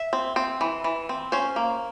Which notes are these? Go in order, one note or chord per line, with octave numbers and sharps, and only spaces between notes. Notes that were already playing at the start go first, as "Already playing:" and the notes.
Already playing: E5
C4
C4
E3
E3
C4
C#4 C5
A#3